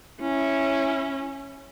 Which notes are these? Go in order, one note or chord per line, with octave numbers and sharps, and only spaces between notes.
C#4 E4